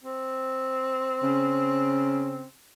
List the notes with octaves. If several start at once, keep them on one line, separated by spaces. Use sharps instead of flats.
C4
C#3